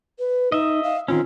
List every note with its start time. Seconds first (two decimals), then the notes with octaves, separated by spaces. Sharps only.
0.19 B4
0.52 D#4 D#5 E5
0.83 F5
1.08 D#3 C4 C#4 F4